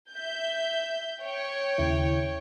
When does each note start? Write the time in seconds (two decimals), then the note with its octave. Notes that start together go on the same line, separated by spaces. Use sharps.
0.13 E5 G6
1.22 C#5 G5
1.78 D#2 C#3 E4